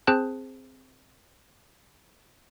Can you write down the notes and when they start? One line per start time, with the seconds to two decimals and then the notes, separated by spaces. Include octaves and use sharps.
0.07 C4 G#4 C5 A5 F#6